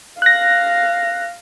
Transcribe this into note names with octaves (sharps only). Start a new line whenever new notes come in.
F5 F#6 A#6